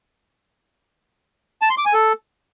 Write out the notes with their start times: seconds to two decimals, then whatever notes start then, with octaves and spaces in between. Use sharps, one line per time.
1.62 A5
1.70 C6
1.78 D6
1.86 G#5
1.94 A4